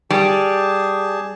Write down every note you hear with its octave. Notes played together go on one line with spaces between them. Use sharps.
G3 G#4 A5